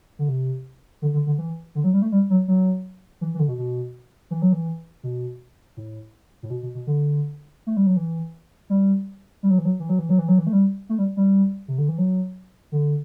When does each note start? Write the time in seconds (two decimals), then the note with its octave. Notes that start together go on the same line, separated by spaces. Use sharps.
0.19 D3
0.28 C3
1.02 D3
1.14 D3
1.27 D3
1.38 E3
1.75 D3
1.84 F#3
1.94 G3
2.02 A3
2.12 G3
2.30 F#3
2.48 F#3
3.21 E3
3.34 E3
3.39 D3
3.48 B2
3.58 B2
4.31 E3
4.42 F#3
4.53 E3
5.03 B2
5.77 A2
6.43 A2
6.50 B2
6.63 B2
6.75 B2
6.87 D3
7.67 A3
7.77 G3
7.87 F#3
7.97 E3
8.70 G3
9.43 G3
9.50 F#3
9.58 E3
9.65 F#3
9.80 E3
9.89 F#3
9.99 E3
10.09 F#3
10.18 E3
10.28 F#3
10.38 E3
10.47 A3
10.53 G3
10.89 A3
10.98 G3
11.17 G3
11.68 C3
11.78 D3
11.89 E3
11.98 F#3
12.72 D3